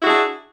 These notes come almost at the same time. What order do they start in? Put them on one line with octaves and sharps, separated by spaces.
E4 F#4 G#4 D4